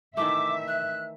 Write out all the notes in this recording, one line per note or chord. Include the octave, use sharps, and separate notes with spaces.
D#3 E3 A3 E5 D6
F#6